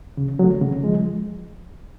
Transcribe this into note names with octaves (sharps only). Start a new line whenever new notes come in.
C#3
F#3 A3
C#3
F3 G#3